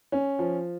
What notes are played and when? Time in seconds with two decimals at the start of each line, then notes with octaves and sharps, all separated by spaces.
0.12 C#4
0.39 F3